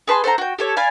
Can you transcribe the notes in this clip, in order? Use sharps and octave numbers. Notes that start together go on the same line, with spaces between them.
G#4 B4 A5 C6
A4 C5 F#5 A#5
F#4 G5
G4 A4 C#5
D5 F5 G#5 B5